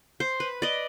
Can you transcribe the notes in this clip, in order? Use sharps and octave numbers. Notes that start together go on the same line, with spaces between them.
C5
B4
D5 D#5